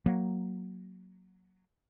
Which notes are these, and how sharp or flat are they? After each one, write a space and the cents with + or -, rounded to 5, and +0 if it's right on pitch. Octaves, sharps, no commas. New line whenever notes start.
F#3 +0 A#3 +0